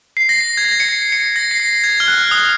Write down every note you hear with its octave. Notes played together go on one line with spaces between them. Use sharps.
C7
A#6
C7
G#6
A#6
C#7
C7
C#7
A#6
C7
A#6
G#6
F6
F#6
D#6